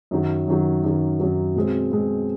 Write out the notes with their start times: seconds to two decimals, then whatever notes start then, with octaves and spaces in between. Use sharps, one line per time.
0.11 F#2 D#3 F#3
0.48 F#2 D#3 F#3
0.84 F#2 D#3 F#3
1.20 F#2 D#3 F#3
1.56 B2 G#3 C4
1.92 B2 G#3 C4